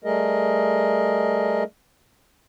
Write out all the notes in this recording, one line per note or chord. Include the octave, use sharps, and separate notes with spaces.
G3 A3 G#4 A#4 D#5